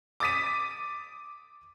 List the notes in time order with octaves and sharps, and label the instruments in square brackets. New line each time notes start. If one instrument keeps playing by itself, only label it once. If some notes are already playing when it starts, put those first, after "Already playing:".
[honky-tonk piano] D6 D#6 A6 B6 D#7